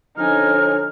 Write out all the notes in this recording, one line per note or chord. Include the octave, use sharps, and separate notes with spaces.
D3 F3 C#4 D#4 G#5 F6